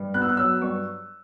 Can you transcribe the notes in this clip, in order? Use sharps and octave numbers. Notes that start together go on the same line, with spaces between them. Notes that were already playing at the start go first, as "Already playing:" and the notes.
Already playing: G2
B3 F#6
E6
F#6
F#3 E6
G2 C#6